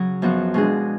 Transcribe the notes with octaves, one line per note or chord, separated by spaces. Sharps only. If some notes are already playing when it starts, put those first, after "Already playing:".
Already playing: C#3 F#3
F#2 F3 B3 F#4
B2 G#3 D4 G#4